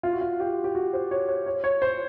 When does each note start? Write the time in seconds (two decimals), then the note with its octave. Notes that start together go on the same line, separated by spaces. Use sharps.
0.03 F4
0.13 F#4
0.21 F4
0.40 G4
0.64 G4
0.75 F#4
0.93 C5
1.11 C#5
1.28 C#5
1.47 C#5
1.64 C#5
1.82 C5